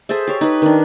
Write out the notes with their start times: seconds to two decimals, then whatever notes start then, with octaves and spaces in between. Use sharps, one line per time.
0.09 G#4 A4 C5 E5
0.27 G4 C#5
0.41 D#4 B4
0.62 D#3 D4